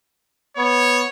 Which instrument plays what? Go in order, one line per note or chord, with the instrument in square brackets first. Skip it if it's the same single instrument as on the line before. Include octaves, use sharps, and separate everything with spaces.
[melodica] B3 [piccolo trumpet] C#5